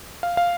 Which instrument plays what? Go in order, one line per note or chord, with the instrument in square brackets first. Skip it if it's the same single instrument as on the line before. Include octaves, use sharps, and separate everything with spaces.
[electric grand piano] F5
F5